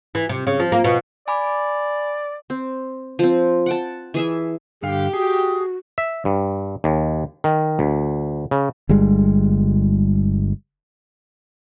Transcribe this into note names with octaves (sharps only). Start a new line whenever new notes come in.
E3
C3
C#3
F3
A#3
B2
D5 G#5 B5 D6
C4
F3 C4
F#5 G5 A5
E3 G#4 E5
G2 D3 G4 F5
F#4 G#4 D#6
E5
G2
D#2
D#3
D2
C#3
G1 G3 G#3